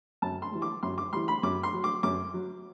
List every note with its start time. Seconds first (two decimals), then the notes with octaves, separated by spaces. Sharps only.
0.22 F#2 A5
0.42 C6
0.52 E3 G3
0.62 D6
0.83 F#2 C6
0.98 D6
1.13 E3 G3 C6
1.28 B5
1.43 F#2 D6
1.63 C6
1.74 F#3
1.84 D6
2.03 F#2 D6
2.34 F#3